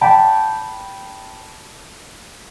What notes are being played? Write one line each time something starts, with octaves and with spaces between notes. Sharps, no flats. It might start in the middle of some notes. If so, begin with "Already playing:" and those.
D5 G5 A5 B5